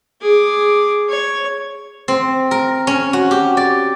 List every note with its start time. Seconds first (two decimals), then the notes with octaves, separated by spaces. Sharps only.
0.21 G#4 D6
1.09 C#5
2.08 C4
2.51 A#4
2.87 C#4
3.13 F#4
3.31 G4
3.57 D5